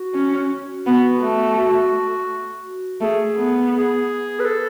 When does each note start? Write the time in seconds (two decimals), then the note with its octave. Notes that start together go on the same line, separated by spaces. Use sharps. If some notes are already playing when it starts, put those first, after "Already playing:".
Already playing: F#4
0.14 C#4
0.86 B3 F#4
1.21 A3 F#4
1.57 F#4
3.01 A3 G#4
3.37 B3
3.73 G#4
4.40 B4
4.45 A4